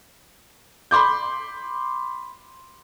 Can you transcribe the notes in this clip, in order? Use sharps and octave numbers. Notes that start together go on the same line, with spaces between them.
B5 C6 D6 G6